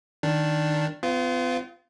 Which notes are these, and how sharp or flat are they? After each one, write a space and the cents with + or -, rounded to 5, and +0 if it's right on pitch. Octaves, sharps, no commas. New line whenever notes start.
D#3 -5 D4 +0
B3 +45 F4 -15